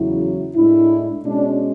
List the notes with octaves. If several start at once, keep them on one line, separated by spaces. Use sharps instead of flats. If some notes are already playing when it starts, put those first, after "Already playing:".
Already playing: E2 C#3 F#3 E4
A2 G#3 D4 E4
B2 G#3 C#4 D4